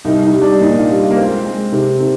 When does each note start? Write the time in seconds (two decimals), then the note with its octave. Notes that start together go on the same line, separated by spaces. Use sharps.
0.05 C2 D#4
0.23 D#4
0.33 G3
0.42 D4
0.60 A#2 D#4
0.79 F4
0.89 G3
0.98 F4
1.11 A#3
1.16 G#3 C4
1.45 G#3
1.72 C3
2.00 C3